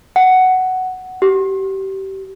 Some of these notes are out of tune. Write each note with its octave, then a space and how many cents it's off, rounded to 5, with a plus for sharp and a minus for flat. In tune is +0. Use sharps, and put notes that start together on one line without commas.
F#5 +10
G4 -30